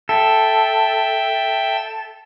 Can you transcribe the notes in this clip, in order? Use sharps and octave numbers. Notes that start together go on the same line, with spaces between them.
A4 E5 G5